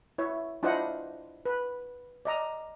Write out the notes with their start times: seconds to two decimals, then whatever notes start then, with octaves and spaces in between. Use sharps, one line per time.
0.18 E4 C#5 E5
0.63 D4 E4 F4 C5 D#5 F#5
1.46 B4
2.25 D5 D#5 A#5